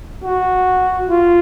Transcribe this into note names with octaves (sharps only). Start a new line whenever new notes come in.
F#4
F4